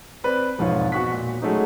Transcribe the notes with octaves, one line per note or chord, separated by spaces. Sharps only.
C4 B4 D5
E1 F2 G#2 F3 F4 C#5
B2 F#4 C#6 F#6 B6
A#2
F#3 G#3 A3 C#4 D#4